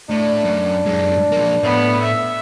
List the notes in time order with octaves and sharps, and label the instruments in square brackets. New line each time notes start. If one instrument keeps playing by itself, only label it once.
[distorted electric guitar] A2 [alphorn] D4
[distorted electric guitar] F#2
F#2 G#3
F3 A#3
[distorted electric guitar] A2 [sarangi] B3
[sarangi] E5